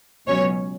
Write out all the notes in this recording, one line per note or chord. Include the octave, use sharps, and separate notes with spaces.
C#2 B2 F#3 C#4 C#5